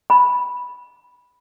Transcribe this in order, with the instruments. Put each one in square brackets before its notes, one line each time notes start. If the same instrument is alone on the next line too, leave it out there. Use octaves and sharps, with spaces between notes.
[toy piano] B5